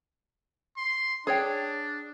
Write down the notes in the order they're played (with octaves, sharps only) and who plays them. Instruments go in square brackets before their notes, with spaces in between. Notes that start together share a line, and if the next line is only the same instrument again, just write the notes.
[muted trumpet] C6
[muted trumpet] D4 [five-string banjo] G#4 C#5 G5